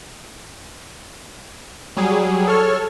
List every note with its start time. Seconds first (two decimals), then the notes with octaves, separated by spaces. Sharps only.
1.97 F#3 G3 G#4
2.47 A4 C#5 F6